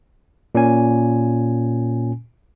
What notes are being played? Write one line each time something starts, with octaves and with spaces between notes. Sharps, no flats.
A#2 C#4 G#5